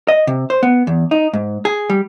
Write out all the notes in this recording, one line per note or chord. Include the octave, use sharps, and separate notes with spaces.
D#5
C3
C5
B3
E2
D#4
G#2
G#4
G3